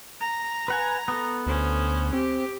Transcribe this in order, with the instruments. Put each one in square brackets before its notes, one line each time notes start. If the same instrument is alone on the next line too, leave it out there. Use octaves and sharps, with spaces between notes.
[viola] A#5
[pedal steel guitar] B4 F#5 G#5
B3 A4
[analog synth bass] D2 [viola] C#4 C5
[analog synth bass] C4 [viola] G4